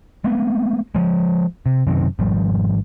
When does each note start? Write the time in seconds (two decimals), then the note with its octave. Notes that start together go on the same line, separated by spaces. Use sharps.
0.24 G#3 A3 B3 C4
0.95 F3 G#3
1.66 C3
1.87 F#2 C3 D#3
2.19 G#1 F3 G3